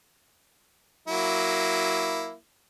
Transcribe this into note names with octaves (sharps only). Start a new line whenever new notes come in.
F#3 A#3 E4